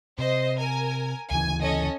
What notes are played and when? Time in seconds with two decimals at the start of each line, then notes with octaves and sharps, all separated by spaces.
0.19 C3 C5 D#5
0.60 A#4 G#5
1.31 D2 C#3 E3 G#5
1.62 C#4 A4 D#5